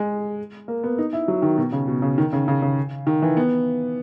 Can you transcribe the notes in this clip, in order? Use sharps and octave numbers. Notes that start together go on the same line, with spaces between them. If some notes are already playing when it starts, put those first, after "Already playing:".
Already playing: G#3
A#3
B3
D#4
E4
F#3
D#3
B2
C#3
B2
C#3
D#3
C#3
C#3
C#3
D#3
E3
B3